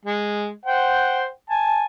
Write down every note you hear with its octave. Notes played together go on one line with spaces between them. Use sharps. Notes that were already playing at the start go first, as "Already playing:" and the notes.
G#3
C5 F#5 G5
G#5 A5